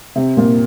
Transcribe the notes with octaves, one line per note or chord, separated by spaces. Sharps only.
C3
A#2